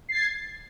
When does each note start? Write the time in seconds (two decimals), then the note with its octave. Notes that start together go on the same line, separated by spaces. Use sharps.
0.09 C7
0.11 A6
0.14 G#6